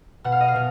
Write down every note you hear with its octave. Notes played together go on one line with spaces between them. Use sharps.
B2 F#5
F5
D#5
F5
B2